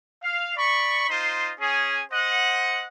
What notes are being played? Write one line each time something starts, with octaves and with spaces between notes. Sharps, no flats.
F5
D5 B5 C#6
D#4 F4 C5 D#5 C6
C#4 G#4
C5 D#5 F#5